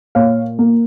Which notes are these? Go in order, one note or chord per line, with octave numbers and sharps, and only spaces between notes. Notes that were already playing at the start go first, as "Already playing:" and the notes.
A#2 C#5 F5
A#3